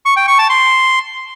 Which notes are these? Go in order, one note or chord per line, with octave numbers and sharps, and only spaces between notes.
C#6
G5
C#6
A5
C6